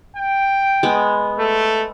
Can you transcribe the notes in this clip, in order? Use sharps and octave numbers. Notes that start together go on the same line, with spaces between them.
G5
G#3 B3
A3